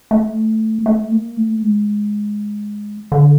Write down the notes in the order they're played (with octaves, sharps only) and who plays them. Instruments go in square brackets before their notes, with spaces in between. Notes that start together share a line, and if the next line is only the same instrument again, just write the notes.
[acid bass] A3
A3
A#3
A3
G#3
D3